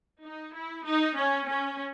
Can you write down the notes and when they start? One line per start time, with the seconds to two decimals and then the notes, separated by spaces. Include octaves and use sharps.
0.25 D#4
0.55 E4
0.87 D#4
1.17 C#4
1.49 C#4